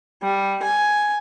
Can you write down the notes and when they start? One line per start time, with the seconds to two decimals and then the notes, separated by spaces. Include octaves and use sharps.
0.22 G3
0.62 G#5